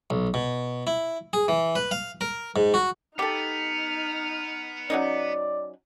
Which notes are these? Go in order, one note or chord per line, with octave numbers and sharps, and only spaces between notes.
B1
B2
E4
G#4
E3
B4
F5
A#4
G#2
F#4
B3 D#4 G4 A4 F6
F#3 C#4 D#4 D5